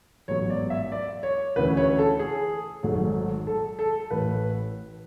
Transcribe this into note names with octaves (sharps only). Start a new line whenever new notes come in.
A1 G#2 F#3 B3 C#5
D5
E5
D5
C#5
D2 C#3 E3 B4
C#5
A4
G#4
G#1 G#2 F#3 A3
A4
A4
A1 A2 E3 B4